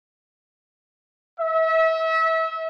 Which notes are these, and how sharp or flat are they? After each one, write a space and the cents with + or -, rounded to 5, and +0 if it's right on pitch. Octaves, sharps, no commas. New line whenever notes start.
E5 -35